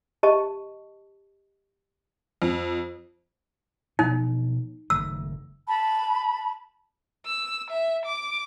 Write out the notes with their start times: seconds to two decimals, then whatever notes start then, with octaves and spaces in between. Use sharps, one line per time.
0.23 G4 D#5 A5 C#6
2.42 F2
3.99 B2 F3 F#3 D#4
4.90 F#1 D#3 A3 E6
5.68 A5 B5
7.26 E6
7.70 E5
8.06 D6